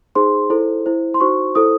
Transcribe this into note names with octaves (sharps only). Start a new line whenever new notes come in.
D#4 G#4 C5 C6
E4 A4 C5
E4 C5
C6
D#4 F#4 C5 C#6
E4 A4 C5 D#6